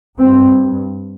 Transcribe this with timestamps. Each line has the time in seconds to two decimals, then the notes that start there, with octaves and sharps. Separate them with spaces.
0.19 G2 C4